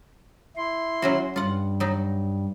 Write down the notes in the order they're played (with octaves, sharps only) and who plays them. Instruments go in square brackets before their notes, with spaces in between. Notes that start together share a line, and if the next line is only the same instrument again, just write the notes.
[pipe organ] E4 C6
[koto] F#3 C#4 F#4
[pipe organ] G2 [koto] F4 F#5
[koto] F#3 D#4